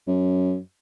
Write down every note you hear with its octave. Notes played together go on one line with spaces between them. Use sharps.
F#2